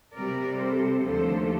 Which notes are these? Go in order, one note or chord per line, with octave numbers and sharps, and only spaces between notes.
C3 G3 C4 A#4 D5
A4 C5
D#2 D3 F3 A3 A4 C5